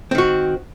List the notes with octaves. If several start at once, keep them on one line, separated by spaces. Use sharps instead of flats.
D#3 C4 F#4